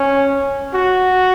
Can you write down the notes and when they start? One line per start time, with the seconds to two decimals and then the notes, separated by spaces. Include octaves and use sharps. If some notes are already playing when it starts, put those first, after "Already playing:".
Already playing: C#4
0.75 F#4